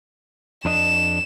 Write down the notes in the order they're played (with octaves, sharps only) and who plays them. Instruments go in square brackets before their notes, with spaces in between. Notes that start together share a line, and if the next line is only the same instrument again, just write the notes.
[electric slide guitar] F2 D4 D#5 [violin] E7